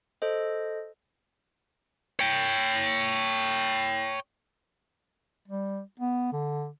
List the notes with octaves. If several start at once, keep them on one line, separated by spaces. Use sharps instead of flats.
A4 C5 D#5
C#5 G5
G3
B3
D3